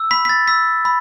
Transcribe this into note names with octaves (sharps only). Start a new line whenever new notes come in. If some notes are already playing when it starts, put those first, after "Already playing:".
Already playing: E6
B5 B6
B6
A6
E6 B6
B5